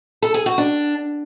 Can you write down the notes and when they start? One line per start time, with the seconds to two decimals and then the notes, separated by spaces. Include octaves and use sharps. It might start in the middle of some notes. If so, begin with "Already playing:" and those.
0.22 A4
0.34 G#4
0.46 F#4
0.58 D4